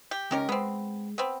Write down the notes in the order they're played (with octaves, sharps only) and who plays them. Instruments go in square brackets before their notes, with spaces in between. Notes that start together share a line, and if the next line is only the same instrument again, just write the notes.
[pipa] G4
[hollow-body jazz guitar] C#2 C#4 [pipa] D#3 G4 A#4
[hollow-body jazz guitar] G#3 [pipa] B3 C4
[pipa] B3 C4